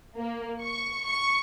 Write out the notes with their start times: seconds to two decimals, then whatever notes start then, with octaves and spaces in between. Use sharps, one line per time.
0.17 A#3
0.61 C#6
1.06 C#6